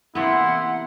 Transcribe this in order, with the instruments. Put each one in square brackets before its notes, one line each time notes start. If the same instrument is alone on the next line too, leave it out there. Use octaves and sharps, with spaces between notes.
[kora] C3 E3 B3 [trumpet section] A#3 C6 [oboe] E4 [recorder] F#5